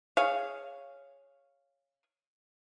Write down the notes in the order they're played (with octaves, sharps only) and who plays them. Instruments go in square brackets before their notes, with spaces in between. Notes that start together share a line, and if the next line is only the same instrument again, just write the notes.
[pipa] G#4 C#5 F5